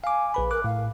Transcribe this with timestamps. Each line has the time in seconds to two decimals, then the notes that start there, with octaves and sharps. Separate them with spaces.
0.04 F5 G#5 D6
0.34 A#1 B4 B5
0.51 A#4 D6 F#6
0.64 A2 F5